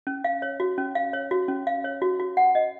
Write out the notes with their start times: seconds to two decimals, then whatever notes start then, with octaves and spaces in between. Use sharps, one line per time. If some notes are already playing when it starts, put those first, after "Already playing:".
0.07 C#4
0.24 F5
0.42 C#5
0.60 F#4
0.78 C#4
0.95 F5
1.13 C#5
1.31 F#4
1.48 C#4
1.67 F5
1.84 C#5
2.02 F#4
2.20 F#4
2.37 F#5
2.55 D#5